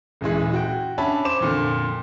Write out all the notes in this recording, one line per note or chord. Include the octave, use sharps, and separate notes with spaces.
D#1 F#2 E3 G#3
F#4 G5
C#4 D4 E5 A5 B5
C5 D6 E7
F2 A#2 D3